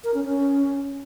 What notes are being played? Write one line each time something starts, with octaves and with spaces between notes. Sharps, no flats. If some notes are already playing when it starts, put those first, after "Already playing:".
A#4
C#4
C#4